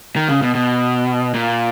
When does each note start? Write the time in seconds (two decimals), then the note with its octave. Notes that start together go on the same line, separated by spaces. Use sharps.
0.16 D#3
0.29 C#3
0.42 B2
0.55 B2
1.34 A#2